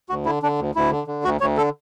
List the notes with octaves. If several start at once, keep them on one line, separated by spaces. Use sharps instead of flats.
D2 F#4
D3 E4
D3 D4
D2
D2 E4
D3
D3
D2 F#4
D2 C#5
D3 A4